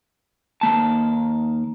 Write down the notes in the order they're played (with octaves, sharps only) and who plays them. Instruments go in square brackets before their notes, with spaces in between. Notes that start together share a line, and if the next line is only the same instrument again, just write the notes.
[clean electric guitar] D#2 A#3 A5